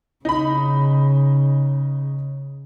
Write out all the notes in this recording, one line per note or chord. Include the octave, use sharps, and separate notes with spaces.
C#3 D#4 B5